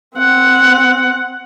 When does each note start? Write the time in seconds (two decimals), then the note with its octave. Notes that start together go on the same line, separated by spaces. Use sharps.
0.16 C4 F#5